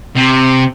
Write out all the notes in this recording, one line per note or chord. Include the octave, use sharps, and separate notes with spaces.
C3